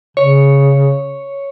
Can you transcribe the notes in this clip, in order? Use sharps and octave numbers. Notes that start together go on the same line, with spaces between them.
C#3 C#5